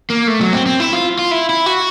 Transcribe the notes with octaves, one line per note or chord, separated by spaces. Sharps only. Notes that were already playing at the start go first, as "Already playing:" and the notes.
A#3
A3
F#3
C4
C4
E4
F4
F4
E4
E4
F#4